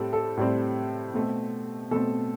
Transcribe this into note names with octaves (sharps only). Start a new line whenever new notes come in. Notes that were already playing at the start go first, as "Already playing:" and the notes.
Already playing: A2 G3 C4 A4
A4
A2 G3 C4
B2 A3 C4
B2 A3 C4 A4